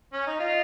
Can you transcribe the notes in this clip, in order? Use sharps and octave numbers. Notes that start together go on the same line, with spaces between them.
C#4
D#4
F4 D#5